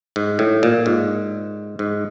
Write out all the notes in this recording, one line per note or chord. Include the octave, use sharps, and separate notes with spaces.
G#2
A2
A#2
G#2
G#2